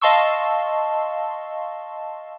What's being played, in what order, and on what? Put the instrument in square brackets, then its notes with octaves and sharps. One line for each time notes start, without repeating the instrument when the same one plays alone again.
[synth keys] D#5 F5 A5 C6 C#6 E6